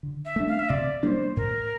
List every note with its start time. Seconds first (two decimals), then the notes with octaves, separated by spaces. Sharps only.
0.03 D3
0.25 E5
0.36 A3 D4
0.48 F5
0.59 E5
0.69 C3 D5
1.03 G3 A#3 D4 C5 D5
1.36 A2 A#4